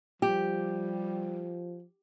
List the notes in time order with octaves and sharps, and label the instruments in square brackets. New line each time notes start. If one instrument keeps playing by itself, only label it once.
[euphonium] F3 [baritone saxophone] G3 [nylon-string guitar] G4